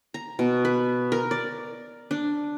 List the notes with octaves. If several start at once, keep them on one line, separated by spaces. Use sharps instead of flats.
A#5
B2
B4
A#4
D5
D4